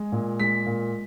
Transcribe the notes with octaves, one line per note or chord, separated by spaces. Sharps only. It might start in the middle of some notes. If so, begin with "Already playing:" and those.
Already playing: G#3
A#2
G#3 B6
A#2